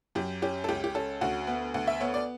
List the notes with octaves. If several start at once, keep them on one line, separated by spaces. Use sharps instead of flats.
F#2 G4
C#4 G4
A4
C#2 G4
G4
C#4 A4
D2 F#4
B3
D2 F#5
E5
B3 C#5
D5